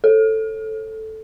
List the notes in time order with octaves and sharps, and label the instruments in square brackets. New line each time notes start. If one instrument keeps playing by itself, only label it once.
[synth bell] A4